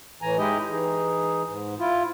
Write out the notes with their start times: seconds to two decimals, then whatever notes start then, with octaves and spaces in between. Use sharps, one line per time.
0.22 A2 E3 G#5 A#5
0.38 G#3 D#4 E4 G4 D#5
0.71 E3 D#4 G#4
1.48 G#2
1.80 E4 F4